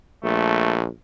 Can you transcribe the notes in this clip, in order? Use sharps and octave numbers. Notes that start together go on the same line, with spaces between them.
A#1 A3